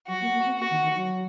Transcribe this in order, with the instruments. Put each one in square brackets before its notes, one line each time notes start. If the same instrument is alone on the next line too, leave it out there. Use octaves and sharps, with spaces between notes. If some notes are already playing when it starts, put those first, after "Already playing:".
[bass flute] F#3 [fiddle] F#4
[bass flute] A#3
A#3
C4
[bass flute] A#3 [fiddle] F#4
[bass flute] D#3
D#3
F#3